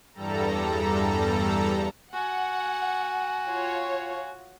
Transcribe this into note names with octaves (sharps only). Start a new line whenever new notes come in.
E2 G2 G3 A4 A#5
F#4 F#5 G#5
F4 C#5